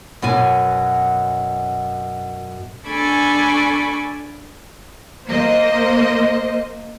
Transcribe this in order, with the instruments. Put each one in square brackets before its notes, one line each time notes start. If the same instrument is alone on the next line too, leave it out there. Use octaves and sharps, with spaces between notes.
[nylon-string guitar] F#2 B2 G#5
[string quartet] D4 A4 G#5 B5 C#6 D6
[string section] A#3 C5 D#5